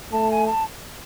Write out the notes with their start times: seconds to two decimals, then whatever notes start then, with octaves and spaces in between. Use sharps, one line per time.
0.12 A3 A5
0.30 G#5
0.47 A5